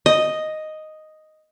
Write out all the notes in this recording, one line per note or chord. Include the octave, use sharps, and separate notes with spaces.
D#5